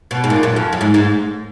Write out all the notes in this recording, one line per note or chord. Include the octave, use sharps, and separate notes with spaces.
B2
G#2
A#2
F#2
F2
F#2
G#2
G#2